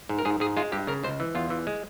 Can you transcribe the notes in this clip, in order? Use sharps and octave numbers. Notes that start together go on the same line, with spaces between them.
G#2
A#4
G#2 G#4
G#2 G#4
G#3 F4
G2 G4
C#3 A#4
C#2 C5
E3
E2 F4
E3
G#3